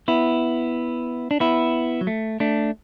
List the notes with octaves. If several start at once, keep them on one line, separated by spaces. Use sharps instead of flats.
B3 E4
D4
B3 E4
F#3
A3
A3 D4